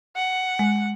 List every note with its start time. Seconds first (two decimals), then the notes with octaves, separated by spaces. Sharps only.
0.16 F#5
0.59 G#3